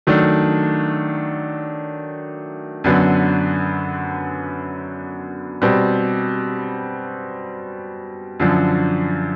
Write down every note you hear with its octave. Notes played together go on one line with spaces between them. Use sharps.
D#3 F#3 A3 D4
F#2 D3 F#3 B3
B2 G3 C4
F#2 D3 F3